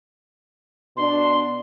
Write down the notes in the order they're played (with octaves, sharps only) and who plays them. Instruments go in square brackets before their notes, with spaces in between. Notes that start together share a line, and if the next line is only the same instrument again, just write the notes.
[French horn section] B2 D4 [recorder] C6